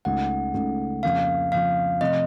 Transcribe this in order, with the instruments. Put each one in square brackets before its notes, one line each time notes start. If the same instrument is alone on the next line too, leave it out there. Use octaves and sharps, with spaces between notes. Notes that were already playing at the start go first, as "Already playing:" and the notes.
[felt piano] C#2 C#3 A3 D#4 [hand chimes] F#5
[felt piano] C#2 C#3 A3 D#4
[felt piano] F2 C#3 F3 A#3 [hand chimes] F5
[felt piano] F2 C#3 F3 A#3 [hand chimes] F5
[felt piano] C3 F3 A3 C4 [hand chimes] D#5